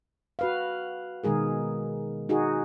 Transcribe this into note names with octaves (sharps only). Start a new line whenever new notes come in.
F#4 B4 F5
B2 D#3 G#3 G#4 A#4
D#4 F#4 G#4